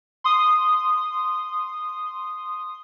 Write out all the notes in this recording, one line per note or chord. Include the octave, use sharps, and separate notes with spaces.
C6 D#6